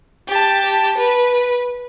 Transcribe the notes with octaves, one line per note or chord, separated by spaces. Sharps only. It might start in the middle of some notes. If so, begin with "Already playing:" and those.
G4 A5
B4